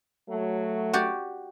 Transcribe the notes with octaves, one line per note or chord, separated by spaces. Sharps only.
F#3 A3
F#4 G4 D5